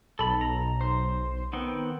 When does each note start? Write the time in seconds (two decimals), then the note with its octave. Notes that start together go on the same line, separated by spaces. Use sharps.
0.19 B1 A4 B5
0.41 A#5
0.81 C5
1.53 D#3 B3 C4